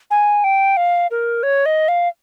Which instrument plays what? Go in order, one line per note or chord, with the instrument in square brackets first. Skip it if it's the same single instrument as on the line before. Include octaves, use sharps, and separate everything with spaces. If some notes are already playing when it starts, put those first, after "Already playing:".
[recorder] G#5
G5
F5
A#4
C#5
D#5
F5